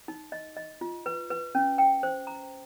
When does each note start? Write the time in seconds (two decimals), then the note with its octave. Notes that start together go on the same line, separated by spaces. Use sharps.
0.08 D#4
0.32 D#5
0.57 D#5
0.81 F4
1.06 B4
1.30 B4
1.55 C#4
1.78 G5
2.03 C5
2.27 A#5